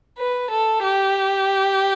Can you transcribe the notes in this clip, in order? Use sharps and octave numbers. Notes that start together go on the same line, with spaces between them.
B4
A4
G4